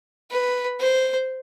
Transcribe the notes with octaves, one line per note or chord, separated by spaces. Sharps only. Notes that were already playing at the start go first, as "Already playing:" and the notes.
B4
C5